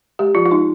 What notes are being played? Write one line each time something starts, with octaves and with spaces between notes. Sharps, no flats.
G#3 G4
F3 F4
F4
G#3 D#4